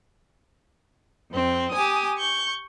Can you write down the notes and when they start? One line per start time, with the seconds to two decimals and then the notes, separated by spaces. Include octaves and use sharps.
1.31 F2 C4
1.71 G4 G#5 D#6
2.19 C#6 G6